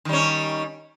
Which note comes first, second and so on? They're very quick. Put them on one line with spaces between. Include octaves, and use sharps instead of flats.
D#3 G3 C#4